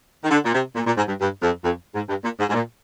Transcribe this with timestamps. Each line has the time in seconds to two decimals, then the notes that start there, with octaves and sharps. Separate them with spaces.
0.24 D#3
0.31 D3
0.45 A#2
0.53 C3
0.75 A#2
0.86 A#2
0.97 G#2
1.08 G2
1.20 G2
1.42 F2
1.64 F2
1.95 G#2
2.09 G2
2.24 A#2
2.39 G#2
2.49 G#2
2.54 A#2